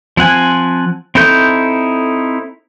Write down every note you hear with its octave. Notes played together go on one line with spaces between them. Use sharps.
F3 C4 F#5 G#5
C4 D#4 E4 A4 G6